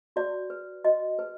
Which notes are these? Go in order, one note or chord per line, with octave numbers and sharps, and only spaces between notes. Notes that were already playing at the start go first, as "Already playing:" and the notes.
F#4 D5
B4
F#4 D#5
B4